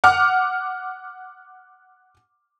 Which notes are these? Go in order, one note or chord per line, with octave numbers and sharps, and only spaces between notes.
F#5 D6 F6